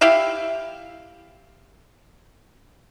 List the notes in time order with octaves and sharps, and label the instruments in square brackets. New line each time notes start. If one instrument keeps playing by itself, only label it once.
[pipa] E4 G4 E5 F5